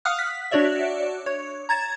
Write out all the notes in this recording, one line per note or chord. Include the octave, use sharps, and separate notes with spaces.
F5 F#5 D#6 F6 F#6
B6
D4 F#4 C#5 D5 E5
C#5
A#5 G#6 A6 E7